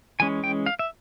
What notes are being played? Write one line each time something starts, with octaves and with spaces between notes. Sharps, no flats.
E3 G#3 C#4 G#5
G5
F5
E5